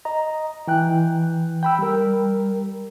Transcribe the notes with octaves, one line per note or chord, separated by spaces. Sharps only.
D#5 A#5
E3 G5 F#6
G5 B5 E6
G3 A#4